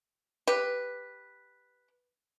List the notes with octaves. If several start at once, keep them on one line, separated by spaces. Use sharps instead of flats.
G4 B4